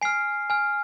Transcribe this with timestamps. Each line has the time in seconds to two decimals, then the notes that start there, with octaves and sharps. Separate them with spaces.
0.01 G#5 F6 C7
0.50 G#5 F6